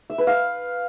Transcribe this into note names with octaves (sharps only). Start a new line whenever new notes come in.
E5
B4
F5